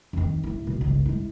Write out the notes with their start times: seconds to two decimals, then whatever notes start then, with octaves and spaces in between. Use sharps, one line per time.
0.13 F2 D#3
0.44 A1 E4
0.67 B2
0.81 G1 C#2
1.06 G#3 E4